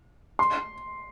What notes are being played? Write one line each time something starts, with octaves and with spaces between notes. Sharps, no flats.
C6